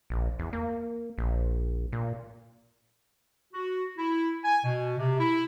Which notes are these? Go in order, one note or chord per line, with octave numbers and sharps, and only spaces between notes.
A#1
E2
A#3
A#1
A#2
F#4
E4
G#5
B2
C3
E4